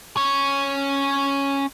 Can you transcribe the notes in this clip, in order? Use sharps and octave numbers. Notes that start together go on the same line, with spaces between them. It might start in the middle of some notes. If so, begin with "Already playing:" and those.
C#4 C#5